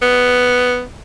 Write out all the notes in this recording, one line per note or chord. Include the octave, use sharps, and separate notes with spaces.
B3